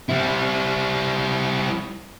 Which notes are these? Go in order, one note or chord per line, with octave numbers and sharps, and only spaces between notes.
G3 E4